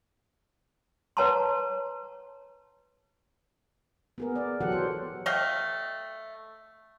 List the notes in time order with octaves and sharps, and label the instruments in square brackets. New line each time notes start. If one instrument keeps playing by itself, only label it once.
[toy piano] B4 C#5 F#5 A5 A#5 C6
[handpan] B3 G#4 A#4
D5
E3 F#3 G4 A4 F#5
C5
[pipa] A3 D#5 F5 G5